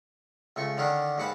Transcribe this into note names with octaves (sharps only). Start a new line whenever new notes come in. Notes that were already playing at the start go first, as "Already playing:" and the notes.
C#2 A3 C#6
D3 D#3 C#4 D4
D#2 G#2 F#5 A5 B5